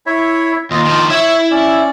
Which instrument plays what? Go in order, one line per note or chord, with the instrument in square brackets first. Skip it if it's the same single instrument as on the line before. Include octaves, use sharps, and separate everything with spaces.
[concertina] E4 C#5 E5
[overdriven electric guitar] D#2 [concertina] F4 D#5
[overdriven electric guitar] D#3 F3
[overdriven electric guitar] E4 E5 [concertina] C#5
[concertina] C#4 D5